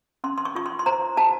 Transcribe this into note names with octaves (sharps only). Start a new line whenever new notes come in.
C#4 C6
C6
C#6
F4 C#6
C6
C6
C5 A#5
F#4 A5